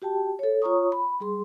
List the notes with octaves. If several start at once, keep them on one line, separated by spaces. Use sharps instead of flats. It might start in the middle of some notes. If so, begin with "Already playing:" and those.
F#4 G4 G5 A5
A4 C#5
F4 C#5 A#5 C#6 D#6
B5
G3 G#4 C6